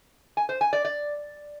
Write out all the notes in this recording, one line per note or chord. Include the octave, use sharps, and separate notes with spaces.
G#5
C5
G#5
D5
D5